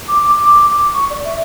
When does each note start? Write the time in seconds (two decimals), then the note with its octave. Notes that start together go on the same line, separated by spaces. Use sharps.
0.08 D6
0.23 D6
0.36 D6
0.94 C#6
1.10 D5
1.24 E5